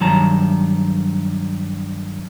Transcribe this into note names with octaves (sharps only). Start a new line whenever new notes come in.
G2 D#3 F#3 A5 A#5